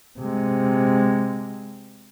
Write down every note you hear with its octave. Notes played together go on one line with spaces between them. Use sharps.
C3 G#3